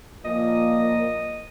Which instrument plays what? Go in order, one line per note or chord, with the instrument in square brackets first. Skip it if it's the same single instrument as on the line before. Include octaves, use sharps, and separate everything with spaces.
[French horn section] A#2 F3 A#3 [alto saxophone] D#5